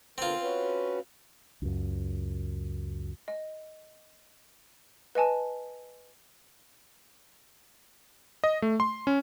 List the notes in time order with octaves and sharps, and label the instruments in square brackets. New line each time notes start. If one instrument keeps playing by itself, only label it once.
[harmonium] D3 B3 A#4 [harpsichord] C4 F4
[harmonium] C#4 F#4 B4
[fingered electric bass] C#2 F#2
[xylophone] D#5
B4 D#5 G#5 A5
[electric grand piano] D#5
A3
C6
C#4